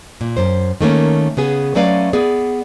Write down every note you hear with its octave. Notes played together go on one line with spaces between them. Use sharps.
A#2
F#2 C5
D#3 A3 A#3 C#4
C#3 B3 G#4
F#3 A3 C#4 B4 D5 F5
B3 G#4 D5